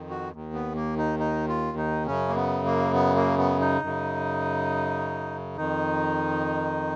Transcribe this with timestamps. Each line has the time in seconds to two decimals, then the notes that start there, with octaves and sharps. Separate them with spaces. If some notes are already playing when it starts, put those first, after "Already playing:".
Already playing: F2 D#3
0.10 F#4
0.32 D#2 D#3
0.53 B3
0.75 A#3
0.98 D#4
1.19 D#4
1.48 F4
1.77 D#4
2.06 F#2 C#3 C#4
2.28 A#3
2.36 B3
2.66 A#3
2.93 B3
3.16 A#3
3.38 B3
3.60 D#4
3.81 F#2
3.87 C#3
5.56 F2 D#3 D#4